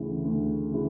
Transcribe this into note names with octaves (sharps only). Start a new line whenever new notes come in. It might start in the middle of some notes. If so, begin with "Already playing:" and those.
Already playing: D2 C#3 E3
D2
C#3 E3